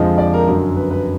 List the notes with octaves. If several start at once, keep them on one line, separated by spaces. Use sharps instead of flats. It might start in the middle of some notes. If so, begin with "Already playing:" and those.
Already playing: F2 D3 F3 G#3 D#5
D5
A#4
F#2 D3 F#3
B4
B4